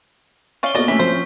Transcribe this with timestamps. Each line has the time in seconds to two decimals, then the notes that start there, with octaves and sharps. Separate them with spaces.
0.63 C#4 D5 F5 C#6 G7
0.75 A#3 B3 A#4 D5 D#5
0.88 E3 A3 C#4 B6
0.99 F3 C4 C#4 C5